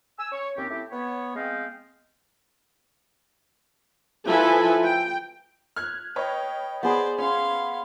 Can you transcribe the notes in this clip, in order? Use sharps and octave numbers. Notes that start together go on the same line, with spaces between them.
G#5 E6
C#5
D#2 C4 C#4 G4
A3 C4 E4 G4
B3 C#5
G#3 B3 C4 D#5 F5 G5
F3 E4 A4 B4 E5 G#5
G5
F6 F#6 G#6
B4 C#5 D#5 G5
B3 G#4 C5 D5
C#4 F5 C6